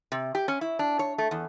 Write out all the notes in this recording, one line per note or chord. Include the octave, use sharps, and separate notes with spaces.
C3
G4
C#4
E4
D4
C#5
A3
E2